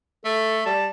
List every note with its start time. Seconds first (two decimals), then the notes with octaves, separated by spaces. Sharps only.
0.25 A3 A4
0.66 G3 A5